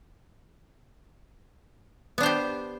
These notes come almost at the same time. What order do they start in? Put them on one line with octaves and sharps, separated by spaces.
B3 D4 C5 G4